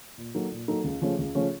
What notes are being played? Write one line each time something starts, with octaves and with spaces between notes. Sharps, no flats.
A#2
F#3 A#3 D#4 A4
A#2
F#3 A#3 D#4 A4
C#2
C#3 F3 A3 C#4
C#2
C#3 F3 A3 C#4